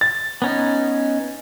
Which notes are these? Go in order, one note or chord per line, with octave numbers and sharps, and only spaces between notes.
A6
B3 C#4 D#4